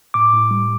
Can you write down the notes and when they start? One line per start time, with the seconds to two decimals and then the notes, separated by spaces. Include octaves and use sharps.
0.14 A2 D6
0.33 A2
0.51 G3